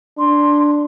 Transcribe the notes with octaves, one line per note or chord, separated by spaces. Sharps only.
D4 C6